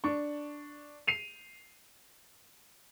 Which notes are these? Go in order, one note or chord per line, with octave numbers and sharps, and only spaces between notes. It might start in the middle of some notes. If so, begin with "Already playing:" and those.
D4 C#6
C7 D#7 F7